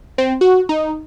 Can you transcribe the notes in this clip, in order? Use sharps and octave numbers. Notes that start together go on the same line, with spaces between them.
C4
F#4
D#4